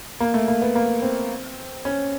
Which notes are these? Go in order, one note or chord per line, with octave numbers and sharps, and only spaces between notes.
A#3
A3
A#3
B3
A#3
C4
C#4